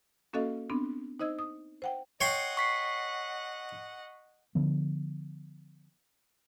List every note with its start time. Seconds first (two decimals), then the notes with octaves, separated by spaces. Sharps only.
0.33 A#3 C#4 F#4 A4 D#5 F5
0.70 B3 C4 D4
1.19 D#4 C5 D#5 E6 G#6
1.39 D#6
1.82 C5 F#5 G5
2.21 C#5 D#5 F#5 G5 C6
2.57 C#6 B6 C7
4.55 D3 F3 B3